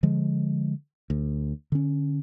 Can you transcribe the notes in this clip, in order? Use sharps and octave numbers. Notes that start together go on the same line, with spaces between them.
D3 F3 G#3
D2
D3 C#4